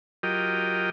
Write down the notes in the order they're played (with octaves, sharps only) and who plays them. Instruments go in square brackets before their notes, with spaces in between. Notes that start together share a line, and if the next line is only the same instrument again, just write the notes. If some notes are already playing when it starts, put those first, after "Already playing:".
[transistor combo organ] F#3 F4 G4 A#4 D#5 G5